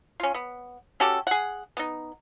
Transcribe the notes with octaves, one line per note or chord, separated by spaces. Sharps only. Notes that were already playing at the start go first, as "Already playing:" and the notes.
C#4 F4
B3
C#4 F#4 G4 A4
G#4 F#5
B3 D#4